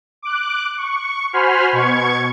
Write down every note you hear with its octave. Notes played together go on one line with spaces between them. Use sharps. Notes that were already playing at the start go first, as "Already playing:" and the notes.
D6 F#6
C#6
F#4 C5 G#5 B5 C6 F6
B2 C#6 G#6